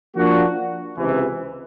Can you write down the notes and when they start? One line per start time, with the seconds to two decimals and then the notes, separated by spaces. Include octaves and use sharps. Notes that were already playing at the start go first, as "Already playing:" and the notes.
0.16 F3 A#3 D4 F#4
0.98 C#2 C3 E3